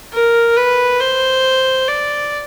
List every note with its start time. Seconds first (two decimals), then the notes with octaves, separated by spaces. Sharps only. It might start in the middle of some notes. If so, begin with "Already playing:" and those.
0.13 A#4
0.57 B4
1.00 C5
1.88 D5